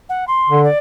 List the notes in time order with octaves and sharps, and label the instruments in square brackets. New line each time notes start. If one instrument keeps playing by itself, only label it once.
[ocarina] F#5
C6
[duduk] D3
[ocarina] D5